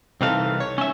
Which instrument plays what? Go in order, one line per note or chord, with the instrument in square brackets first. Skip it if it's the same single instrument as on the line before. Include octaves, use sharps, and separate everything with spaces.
[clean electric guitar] C2 E3 F5 [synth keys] C4 D#4 A4
[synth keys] C#5
[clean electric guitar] C#4 E5